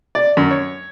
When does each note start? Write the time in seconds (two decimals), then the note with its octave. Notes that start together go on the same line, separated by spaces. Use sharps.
0.15 D5
0.37 F#2
0.51 C#5